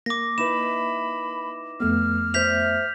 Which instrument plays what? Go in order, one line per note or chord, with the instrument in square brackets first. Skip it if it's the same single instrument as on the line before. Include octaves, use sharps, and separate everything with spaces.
[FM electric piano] A#3 [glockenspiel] D6 A#6
[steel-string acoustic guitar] D#4 E4 B4 [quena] B5 [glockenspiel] E7
[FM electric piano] F2 A3 B3 [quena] F6
[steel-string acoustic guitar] C5 E5 [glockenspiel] G6 B6 F7